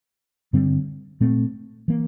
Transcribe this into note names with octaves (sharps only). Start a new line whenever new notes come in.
G2 D3 G3 C4
A#2 A3 C4
E3 A#3